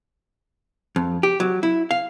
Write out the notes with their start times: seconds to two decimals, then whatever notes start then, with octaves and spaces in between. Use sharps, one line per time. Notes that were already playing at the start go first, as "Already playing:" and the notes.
0.96 F2
1.23 G4
1.40 F#3
1.63 E4
1.91 F5